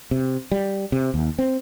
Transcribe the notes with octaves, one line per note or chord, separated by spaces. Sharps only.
C3
G3
C3
D#2
C4